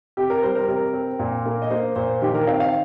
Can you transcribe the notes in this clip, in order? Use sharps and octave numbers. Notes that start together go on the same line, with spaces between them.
C3 G4
A#4
G3 C5
A#4
C3 A#4
C4
A#2
A#3
D#5
A#3 C5
A#2 C5
D#3 G4
A#4
C4 F5
F5